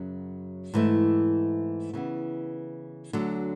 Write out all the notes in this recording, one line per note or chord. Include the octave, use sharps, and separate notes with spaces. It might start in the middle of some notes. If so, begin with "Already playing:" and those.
Already playing: F#2 C#3 F#3
G#2 E3 A3
C#3 E3 B3
D2 D3 F#3